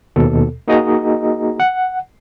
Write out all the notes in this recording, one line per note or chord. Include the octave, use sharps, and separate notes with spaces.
D#2 B2 A4
A#3 D#4 F#4 G#4 D#5 A#5
F#5